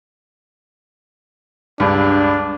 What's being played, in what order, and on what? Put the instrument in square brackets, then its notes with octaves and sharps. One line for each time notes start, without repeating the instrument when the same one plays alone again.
[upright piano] C#2 G2 [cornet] D4